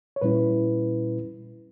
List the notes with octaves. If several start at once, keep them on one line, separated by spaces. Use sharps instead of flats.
C#5
A#2 G3 C#4 E4 B4